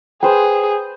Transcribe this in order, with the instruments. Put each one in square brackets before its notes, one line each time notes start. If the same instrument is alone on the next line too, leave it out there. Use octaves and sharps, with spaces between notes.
[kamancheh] G#4 [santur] B4 C5 [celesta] G5